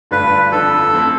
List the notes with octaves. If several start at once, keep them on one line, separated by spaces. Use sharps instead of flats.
G2 D3 A3 D4 F4 B4
F2 D3 F3 A4
F3 A3 C4 E4